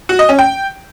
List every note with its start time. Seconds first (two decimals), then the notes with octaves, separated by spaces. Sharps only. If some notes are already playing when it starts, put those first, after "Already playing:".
0.09 F#4
0.19 D#5
0.29 C#4
0.39 G5